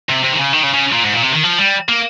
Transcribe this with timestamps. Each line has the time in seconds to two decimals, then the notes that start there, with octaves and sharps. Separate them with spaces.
0.09 C3
0.23 C3
0.33 D#3
0.38 C#3
0.53 D#3
0.63 C#3
0.74 C#3
0.93 A#2
1.04 G#2
1.13 A#2
1.23 C3
1.33 D#3
1.43 F3
1.58 G3
1.88 A#3